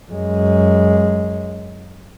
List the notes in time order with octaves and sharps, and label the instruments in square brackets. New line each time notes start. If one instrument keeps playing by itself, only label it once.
[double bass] F#2 G#3